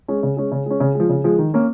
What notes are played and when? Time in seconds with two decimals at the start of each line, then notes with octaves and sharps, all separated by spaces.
0.08 G#3 C#4
0.23 C#3
0.37 G#3 C#4
0.52 C#3
0.66 G#3 C#4
0.80 C#3
0.95 F3 G#3
1.09 C#3
1.24 F3 G#3
1.38 D#3
1.54 A#3 C#4